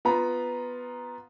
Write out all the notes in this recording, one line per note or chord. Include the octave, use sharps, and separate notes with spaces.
B3 F4 A#5 B5